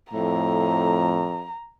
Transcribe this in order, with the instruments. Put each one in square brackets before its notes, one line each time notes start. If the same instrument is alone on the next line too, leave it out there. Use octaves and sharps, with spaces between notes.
[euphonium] F2 [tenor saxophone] A2 [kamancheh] A#5